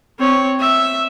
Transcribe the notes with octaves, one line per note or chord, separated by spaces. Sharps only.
C4 C#5
E5